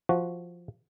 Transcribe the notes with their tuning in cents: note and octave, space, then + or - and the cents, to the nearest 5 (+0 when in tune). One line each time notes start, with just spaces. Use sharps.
F3 +0 F#4 +0